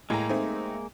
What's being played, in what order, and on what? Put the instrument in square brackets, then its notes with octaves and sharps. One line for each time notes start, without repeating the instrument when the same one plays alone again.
[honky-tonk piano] A2 A#5 [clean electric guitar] G#3 A#3
[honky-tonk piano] A3 C4 D#4